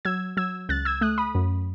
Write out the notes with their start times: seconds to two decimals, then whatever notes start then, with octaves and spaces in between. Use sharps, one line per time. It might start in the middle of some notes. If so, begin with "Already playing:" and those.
0.05 F#3 E6 G#6
0.37 F#3 E6 G#6
0.69 C#2 F#6 A6
0.85 E6 G#6
1.01 A3 D#6 F#6
1.18 B5 D#6
1.35 F#2